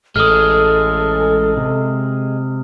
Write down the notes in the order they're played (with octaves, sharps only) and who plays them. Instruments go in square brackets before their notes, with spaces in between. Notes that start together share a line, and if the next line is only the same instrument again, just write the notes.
[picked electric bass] A1 [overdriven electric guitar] G#3 [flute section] A4 [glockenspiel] D#6 F6
[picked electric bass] C3